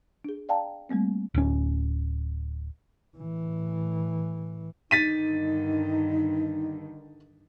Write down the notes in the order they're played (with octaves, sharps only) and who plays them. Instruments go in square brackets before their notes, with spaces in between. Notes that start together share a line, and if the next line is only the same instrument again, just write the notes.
[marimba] D4 G#4
D5 F5 G5 A5 A#5
G3 A3 A#3 C4
[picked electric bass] D1 C#4
[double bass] A2 E3
[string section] G2 D3 D#3 [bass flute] D#4 [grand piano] A6 B6 D#7